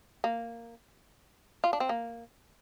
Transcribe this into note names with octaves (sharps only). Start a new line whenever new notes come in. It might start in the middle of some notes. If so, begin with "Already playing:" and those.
A#3
F4
D4
C4
A#3